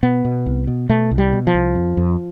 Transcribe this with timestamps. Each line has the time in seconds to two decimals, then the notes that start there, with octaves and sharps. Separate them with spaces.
0.03 B2 B3
0.25 B2
0.46 C2
0.67 B2
0.89 B2 A3
1.11 C2
1.18 G3
1.33 B2
1.47 F3
1.54 C2
1.75 F2
1.97 F2